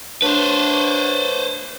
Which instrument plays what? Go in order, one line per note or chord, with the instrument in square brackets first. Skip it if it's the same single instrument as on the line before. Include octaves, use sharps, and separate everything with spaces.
[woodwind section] F#3 A3 D4 [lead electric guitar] B4 C5